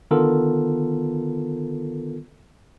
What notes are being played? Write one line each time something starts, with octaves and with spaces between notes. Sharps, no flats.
D3 D#3 B3 F4 A4 A#4